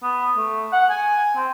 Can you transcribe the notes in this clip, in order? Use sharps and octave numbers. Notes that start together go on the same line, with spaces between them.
B3
A3
F#5
G#5
C4